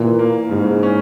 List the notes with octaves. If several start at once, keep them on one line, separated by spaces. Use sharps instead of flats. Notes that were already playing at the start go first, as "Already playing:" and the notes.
Already playing: A#2 E3
A#3
G#2 C#3
C#4